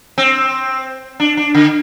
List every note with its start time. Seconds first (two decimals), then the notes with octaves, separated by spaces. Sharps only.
0.18 C4
1.20 D4
1.37 D4
1.55 D3